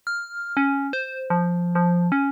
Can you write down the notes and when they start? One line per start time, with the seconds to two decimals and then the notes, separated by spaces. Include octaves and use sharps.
0.07 F6
0.57 C#4
0.93 C5
1.30 F3
1.75 F3
2.12 C#4